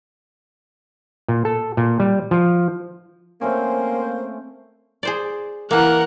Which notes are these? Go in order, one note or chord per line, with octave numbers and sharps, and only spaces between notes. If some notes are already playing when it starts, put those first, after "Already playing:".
A#2
A4
A#2
G3
F3
A3 A#3 C4 C#4 C5
G#4 C5 D5
E3 A#3 A#4 F#5